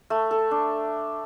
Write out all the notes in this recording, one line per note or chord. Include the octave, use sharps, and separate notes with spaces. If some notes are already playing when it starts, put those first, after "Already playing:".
A3
A4
D4